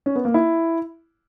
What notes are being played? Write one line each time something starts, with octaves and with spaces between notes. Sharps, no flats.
C#4
B3
A#3
E4